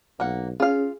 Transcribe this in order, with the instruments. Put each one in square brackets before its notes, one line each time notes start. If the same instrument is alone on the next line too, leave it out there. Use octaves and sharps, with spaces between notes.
[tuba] B1 [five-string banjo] A#3 F#5
[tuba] C#4 [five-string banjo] F4 F5 [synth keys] G#4